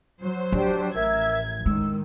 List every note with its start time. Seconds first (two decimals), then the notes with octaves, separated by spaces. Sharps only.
0.20 F#3 C5
0.52 F3 D4 G4
0.94 A1 A#4 E5 E6 G#6
1.66 D#3 G#3 E6